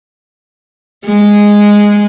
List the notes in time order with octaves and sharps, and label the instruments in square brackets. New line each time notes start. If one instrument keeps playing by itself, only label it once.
[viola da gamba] G#3